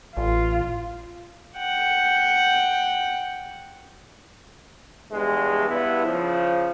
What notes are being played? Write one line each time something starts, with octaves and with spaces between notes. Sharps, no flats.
A1 F4
F#5 G5
E2 G2 G#3
G2 B3 E4
C#3 F3